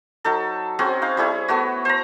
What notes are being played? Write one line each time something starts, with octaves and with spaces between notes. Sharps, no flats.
F#3 D#4 A4
C4 C#4 F#4 G#4
D#4 F5
G3 E4 G#4 C#5
A3 B3 F#4
C5 A#5